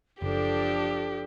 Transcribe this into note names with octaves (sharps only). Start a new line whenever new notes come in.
F#1 F3 D4 G4 A4